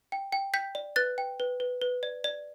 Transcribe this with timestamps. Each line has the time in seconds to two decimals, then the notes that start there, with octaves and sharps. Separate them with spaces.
0.12 G5
0.32 G5
0.54 G5 G6 B6
0.75 D5
0.96 B4 F#6 A6
1.18 G5
1.40 B4
1.60 B4
1.81 B4
2.03 D5
2.24 D5